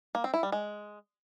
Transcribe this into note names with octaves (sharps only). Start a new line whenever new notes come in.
A#3
C4
E4
G3
G#3